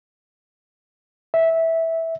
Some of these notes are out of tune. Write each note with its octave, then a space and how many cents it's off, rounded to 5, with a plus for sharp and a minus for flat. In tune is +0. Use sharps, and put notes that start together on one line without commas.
E5 -10